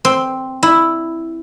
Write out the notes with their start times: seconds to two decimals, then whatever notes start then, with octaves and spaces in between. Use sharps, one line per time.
0.05 C4
0.63 E4